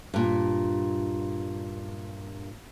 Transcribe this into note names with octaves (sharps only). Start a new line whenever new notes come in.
G2 A#2